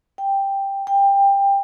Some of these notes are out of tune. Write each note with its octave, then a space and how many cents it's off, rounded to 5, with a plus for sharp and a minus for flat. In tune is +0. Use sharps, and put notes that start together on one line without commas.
G5 +5
G5 +20